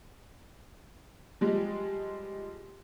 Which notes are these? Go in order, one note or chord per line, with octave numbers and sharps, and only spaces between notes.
F3 G3 G#3